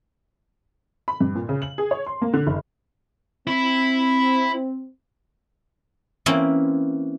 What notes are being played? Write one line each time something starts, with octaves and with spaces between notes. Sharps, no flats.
B5
G2
A#2
C#3
F#7
G#4
C#5
C6
A#3
D3
F#1
C4 E4
E3 A#3 C4 C#4